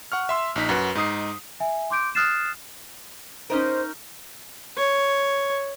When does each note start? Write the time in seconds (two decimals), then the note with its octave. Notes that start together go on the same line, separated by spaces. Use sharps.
0.12 F#5 C#6 F6
0.29 E5 C6 E6
0.56 A#1 D#4 B6
0.69 F#2 F#4 B4
0.95 G#2 D#4 D#6 C7
1.60 E5 G#5
1.90 C6 D6 G6 D7
2.15 D#6 F6 F#6 A6 C7 E7
3.50 C#4 D#4 A#4 C5
4.78 C#5